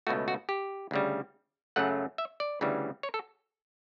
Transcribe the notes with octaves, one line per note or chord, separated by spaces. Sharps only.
C#2 B2 A3 F#4
F#4
G4
D2 C#3 G3
F#2 C#3 F#3 A3 F#5
E5
D5
D2 C#3 E3 G3
C#5
A4